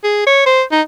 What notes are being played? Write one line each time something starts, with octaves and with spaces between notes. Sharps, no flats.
G#4
C#5
C5
D#4